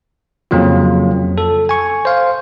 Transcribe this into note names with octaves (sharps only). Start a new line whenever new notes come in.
F2 C#3 F#3 A#3 F4
A4
G#5 C#6
C5 F5